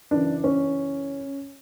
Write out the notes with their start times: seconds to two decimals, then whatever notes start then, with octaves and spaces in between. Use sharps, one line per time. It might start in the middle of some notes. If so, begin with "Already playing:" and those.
0.11 F#2 C#3 E3 D4
0.44 C#4